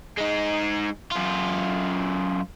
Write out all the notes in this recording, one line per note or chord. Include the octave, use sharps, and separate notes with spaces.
G#3 D#4
F#2 F4